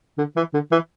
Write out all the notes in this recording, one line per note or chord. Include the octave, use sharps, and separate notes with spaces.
D3
E3
D3
E3